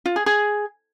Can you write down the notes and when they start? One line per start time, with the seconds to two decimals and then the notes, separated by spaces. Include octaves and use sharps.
0.06 F4
0.16 G#4
0.26 G#4